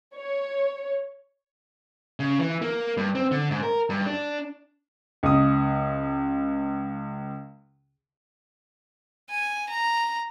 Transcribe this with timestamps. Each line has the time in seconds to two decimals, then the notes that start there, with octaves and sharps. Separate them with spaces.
0.16 C#5
2.20 C#3
2.40 E3
2.62 A#3
2.97 G2
3.15 C4
3.31 D3
3.51 G#2
3.63 A#4
3.90 G2
4.06 D4
5.23 C#2 D#6
9.30 G#5
9.69 A#5